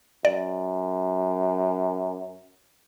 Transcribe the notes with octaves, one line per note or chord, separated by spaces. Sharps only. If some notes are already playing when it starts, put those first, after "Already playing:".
F#2 D5